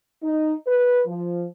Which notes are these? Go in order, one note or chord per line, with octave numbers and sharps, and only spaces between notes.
D#4
B4
F3